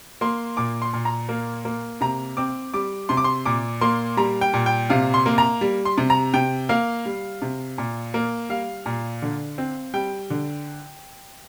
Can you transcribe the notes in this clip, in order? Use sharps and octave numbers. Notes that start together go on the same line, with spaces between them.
A#3 C6
A#2 D6
C6
A#2
A#5
A#3
A#3
C3 A#5
C4 D6
G3 D6
C3 C6
D6
C6
A#2 D6
A#3 C6
G3 A#5
G5
A#2
G5
C3 F5
C6
A#3
A#5
G3
C6
C3
A#5
C3 G5
A#3 F5
G3
C3
A#2
A#3
G3 F5
A#2
D3
C4
G3 G5
D3